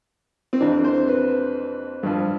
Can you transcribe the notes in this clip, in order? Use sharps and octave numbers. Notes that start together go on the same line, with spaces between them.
C4
F2 C3 E3 D4
C5
B4
G2 F3